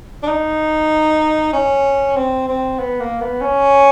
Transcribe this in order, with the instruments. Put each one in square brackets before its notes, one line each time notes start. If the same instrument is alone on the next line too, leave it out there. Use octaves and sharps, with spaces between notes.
[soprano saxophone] D4
D#4
C#4
C4
C4
B3
A#3
B3
C#4